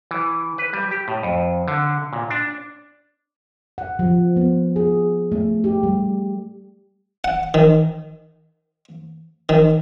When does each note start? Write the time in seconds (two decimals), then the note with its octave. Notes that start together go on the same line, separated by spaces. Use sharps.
0.11 E3
0.58 B4
0.73 G3
0.91 G4
1.08 A2
1.23 F2
1.68 D3
2.13 A#2
2.30 D4
3.78 F#5
3.99 F3
4.36 B3
4.76 G#4
5.32 A3
5.64 G4
5.83 G3
7.24 F#5
7.54 D#3
9.49 D#3